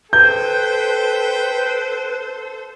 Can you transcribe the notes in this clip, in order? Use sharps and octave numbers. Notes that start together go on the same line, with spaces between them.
A4 B4 C5 G5 G6